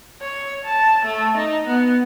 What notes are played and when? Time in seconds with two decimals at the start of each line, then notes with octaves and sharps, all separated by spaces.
0.22 C#5
0.64 A5
1.05 A3
1.37 D#4
1.67 B3